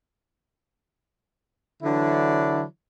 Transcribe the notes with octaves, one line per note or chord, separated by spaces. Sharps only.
D3 E3 F#3 D4 E4